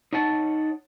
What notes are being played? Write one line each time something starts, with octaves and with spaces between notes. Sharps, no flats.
D#4 C#5 F#5 A5